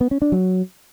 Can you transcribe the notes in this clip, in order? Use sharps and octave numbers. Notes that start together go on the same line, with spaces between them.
B3
C#4
D4
F#3